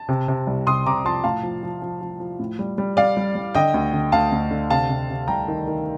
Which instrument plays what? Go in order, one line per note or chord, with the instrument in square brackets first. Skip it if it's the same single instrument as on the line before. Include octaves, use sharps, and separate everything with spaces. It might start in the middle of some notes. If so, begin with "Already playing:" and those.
Already playing: [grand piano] A5
C3
C3
C2
C3 C6 D#6
C3 A#5 D6
F3 A5 C6
A2 F5 A5
F3
F3
F3
F3
F3
A2
G3
G3
G3 D5 F5
G3
G3
D3 D#5 G5
D2
D3
D2 F5 A5
D2
D3
C3 F5 A5
C3
C3
C2 G5 A#5
D#3
D#3